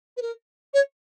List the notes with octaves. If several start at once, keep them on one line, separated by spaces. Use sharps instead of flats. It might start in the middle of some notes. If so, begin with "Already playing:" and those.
B4
A#4
C#5